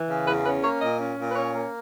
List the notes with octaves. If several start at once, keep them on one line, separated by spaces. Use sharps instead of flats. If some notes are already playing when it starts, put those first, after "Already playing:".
Already playing: E3
C#3
E2 B4
C#4 B4
A#3 C#5
A#2 D#5
C#4
A#2
B4
C#4 C#5
A#3